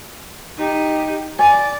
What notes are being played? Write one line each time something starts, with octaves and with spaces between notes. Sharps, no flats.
D#4 G4
D5 G#5